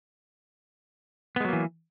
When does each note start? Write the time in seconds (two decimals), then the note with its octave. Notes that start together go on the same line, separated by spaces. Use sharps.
1.36 B3
1.40 G#3
1.45 F#3
1.49 A#3
1.53 E3